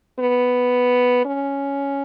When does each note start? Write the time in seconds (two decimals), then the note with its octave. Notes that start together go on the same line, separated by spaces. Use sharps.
0.19 B3
1.25 C#4